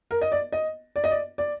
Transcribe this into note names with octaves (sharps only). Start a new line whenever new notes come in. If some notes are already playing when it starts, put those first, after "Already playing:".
A#4
D#5
D5
D#5
D5
D#5
D5
D5